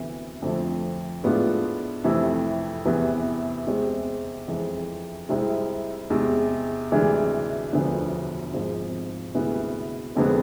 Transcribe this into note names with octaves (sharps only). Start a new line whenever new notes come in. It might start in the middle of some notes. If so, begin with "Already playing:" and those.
Already playing: D2 C3 E3 B3
F2 D3 F3 A3
A2 G#3 B3 D4 F4
F2 C3 E3 A3 E4
E2 C3 E3 B3
E2 C3 G#3 C4
F2 E3 G#3
C2 C3 G#3 C4 E4
E2 C3 G#3
D2 C3 E3 G#3 D4
E1 D2 D3 F3 B3
G#1 G#2 F3
D2 C3 G#3 B3 E4
F1 F2 D3 G#3 B3